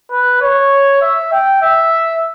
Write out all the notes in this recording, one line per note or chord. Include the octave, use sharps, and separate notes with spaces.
B4
C#5
E5
G5
E5